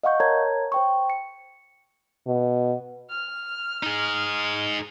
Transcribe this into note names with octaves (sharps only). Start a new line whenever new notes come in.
D#5 F5 F#5 C#6 G6
A#4 C#5 A5 A#5 G#6
C5 G5 C#6
C#7
B2
F6
D#4 G#4